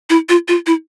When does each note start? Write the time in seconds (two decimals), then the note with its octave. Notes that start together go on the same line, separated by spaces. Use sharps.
0.10 E4
0.29 F4
0.48 F4
0.67 E4